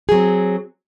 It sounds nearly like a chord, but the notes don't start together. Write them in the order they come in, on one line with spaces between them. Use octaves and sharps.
G#4 F#3 C4